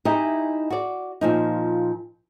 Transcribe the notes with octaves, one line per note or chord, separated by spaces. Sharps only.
D#4 E4 G4 D#5 G#5
F#4 D5
A#2 F3 D#4